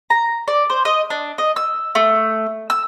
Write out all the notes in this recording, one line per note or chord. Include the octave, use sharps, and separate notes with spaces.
A#5
D5
C5
D#5
D4
D#5
E6
A3
E6